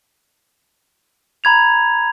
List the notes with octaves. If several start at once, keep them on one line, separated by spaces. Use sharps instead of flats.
A#5 B5 G#6 F7